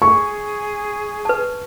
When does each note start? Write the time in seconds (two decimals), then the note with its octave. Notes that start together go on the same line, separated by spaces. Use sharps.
0.02 G#4 C#6
1.25 B4 A5